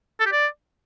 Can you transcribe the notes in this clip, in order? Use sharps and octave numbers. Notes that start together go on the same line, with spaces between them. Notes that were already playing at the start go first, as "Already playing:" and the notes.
A4
G4
D5